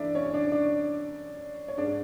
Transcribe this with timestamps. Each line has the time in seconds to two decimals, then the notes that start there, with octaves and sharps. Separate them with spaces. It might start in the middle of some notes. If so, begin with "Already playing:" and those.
Already playing: F#2 E3 A3 C#4 D4 D5 E5
0.15 C#4 C#5
0.33 D4 D5
0.52 D4 D5
1.68 C#5
1.77 G#2 G#3 C#4 D4 D5